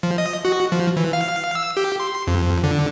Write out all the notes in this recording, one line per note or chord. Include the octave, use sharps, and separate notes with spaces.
F3
D#5
F#4
F3
E3
F5
E6
G4
C6
F2
D3